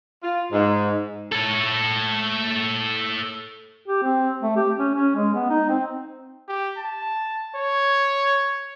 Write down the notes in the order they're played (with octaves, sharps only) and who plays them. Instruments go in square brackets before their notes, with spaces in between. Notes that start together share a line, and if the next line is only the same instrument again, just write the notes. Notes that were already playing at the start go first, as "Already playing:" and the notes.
[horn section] F4
G#2
[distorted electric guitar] A4 C#5
[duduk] G4
C4
A3
G4
C#4
C#4
G#3
B3
D#4
C4
[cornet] G4
A5
C#5